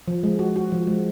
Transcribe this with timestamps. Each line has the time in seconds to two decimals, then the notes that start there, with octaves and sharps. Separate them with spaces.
0.08 F3
0.23 G#3
0.39 F#4
0.56 F#4
0.72 F3
0.87 G#3